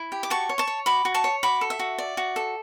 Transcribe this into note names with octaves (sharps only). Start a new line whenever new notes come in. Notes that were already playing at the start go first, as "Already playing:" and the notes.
Already playing: E4
G4
D6
F#4 A5 C#6
C#5
A5 C#6
C#5
F#4 B5 D6
F#4
A5 C#6
C#5
F#4 B5 D6
A4
E5
F#4
D5
F#4
A4